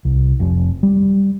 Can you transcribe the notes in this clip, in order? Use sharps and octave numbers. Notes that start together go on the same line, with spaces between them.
C2
F1
G3